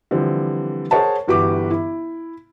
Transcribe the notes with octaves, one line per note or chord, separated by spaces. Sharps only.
D3 E3 F3 G3 C4
G#4 A#4 C5 C#5 F#5 A5
G1 E3 F#4 G4 B4 D6
E4